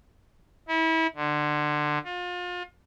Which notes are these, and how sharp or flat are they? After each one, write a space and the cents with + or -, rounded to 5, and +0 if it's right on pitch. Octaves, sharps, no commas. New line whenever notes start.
E4 -30
D3 +25
F4 +35